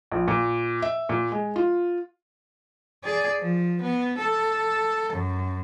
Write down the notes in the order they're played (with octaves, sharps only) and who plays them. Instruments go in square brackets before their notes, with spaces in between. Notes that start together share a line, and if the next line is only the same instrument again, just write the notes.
[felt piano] A#1
A#2
E5
A#2
G#3
F4
[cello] G#4 D5
F3
B3
A4
F#2